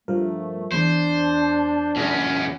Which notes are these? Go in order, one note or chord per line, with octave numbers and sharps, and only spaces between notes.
G2 F3 A3 A#4
E2 D4 C5
E2 C#4